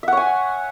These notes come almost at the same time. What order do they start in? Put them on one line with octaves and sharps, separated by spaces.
E5 F#5 C#5 G#5